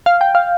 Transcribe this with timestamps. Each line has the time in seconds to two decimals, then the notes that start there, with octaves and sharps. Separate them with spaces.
0.06 F5
0.21 G5
0.35 F5